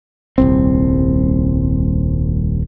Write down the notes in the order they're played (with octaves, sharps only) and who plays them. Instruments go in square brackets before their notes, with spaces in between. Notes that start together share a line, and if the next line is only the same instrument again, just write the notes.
[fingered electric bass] D#1 C2 C4